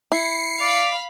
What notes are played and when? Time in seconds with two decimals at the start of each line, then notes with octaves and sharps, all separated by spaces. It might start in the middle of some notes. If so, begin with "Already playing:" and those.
0.12 E4 C7 C#7
0.61 D5 F5 B5 B6